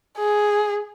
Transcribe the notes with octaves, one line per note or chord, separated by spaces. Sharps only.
G#4